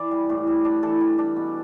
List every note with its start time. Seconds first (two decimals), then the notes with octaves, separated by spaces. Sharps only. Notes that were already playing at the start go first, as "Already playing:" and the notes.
Already playing: E3 D5
0.11 G3
0.30 A2
0.47 G3
0.65 D4
0.83 E3 A4
1.00 G3
1.18 D4
1.36 B2